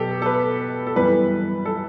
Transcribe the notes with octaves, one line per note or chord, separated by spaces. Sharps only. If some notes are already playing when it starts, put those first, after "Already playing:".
Already playing: B2 F#3 B3 G4 A4
A4
B4
A4
F#2 E3 G3 B3 B4
A4